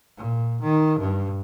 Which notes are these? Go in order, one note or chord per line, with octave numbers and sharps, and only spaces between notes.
A#2
D#3
G2